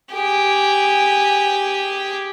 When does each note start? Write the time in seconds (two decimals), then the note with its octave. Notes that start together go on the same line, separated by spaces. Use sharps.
0.12 G4 G#4